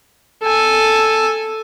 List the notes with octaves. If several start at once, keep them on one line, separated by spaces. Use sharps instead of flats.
A4 G#5